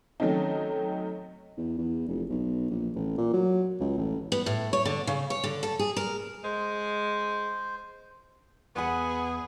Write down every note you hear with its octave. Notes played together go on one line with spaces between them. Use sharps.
D#3 F#3 A3 C4 C#4 D#4
E2
E2
F1
B1
A#1
A1
A#2
F#3
C#2
A1
B3
A2
C#5
D3
C#3
C#5
D3
A4
G#4
A#4
G#3 C5
E2 B3 G#4 F#5 B5